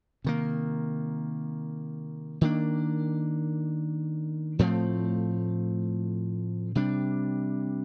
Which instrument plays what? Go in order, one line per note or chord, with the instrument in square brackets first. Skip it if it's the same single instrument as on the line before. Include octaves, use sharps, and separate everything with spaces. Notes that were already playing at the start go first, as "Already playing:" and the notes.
[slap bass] C3 D#3 A#3
D#3 A#3 D4
A2 F3 A3 C4
C3 G3 D4